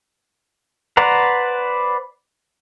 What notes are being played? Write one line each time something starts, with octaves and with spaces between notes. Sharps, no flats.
B4 C5 D5 F#5 A#5